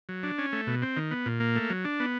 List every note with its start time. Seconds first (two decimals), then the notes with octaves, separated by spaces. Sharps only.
0.09 F#3
0.23 D4
0.38 C#4
0.52 A3
0.67 B2
0.82 C4
0.97 D#3
1.11 B3
1.26 A#2
1.40 A#3
1.56 A3
1.70 F#3
1.85 D4
2.00 B3